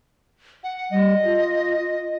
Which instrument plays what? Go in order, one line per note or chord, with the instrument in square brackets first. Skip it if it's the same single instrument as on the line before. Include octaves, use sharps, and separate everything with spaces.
[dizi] F#5
[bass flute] G3 [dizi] D#5
[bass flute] F4